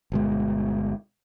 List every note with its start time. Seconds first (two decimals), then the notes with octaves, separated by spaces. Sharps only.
0.12 G1 B2 G#3